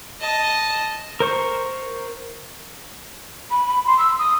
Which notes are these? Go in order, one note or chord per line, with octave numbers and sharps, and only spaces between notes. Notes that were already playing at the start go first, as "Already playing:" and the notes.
D#5 A5
A#4 C5 C#6
B5
B5
C6
E6
D#6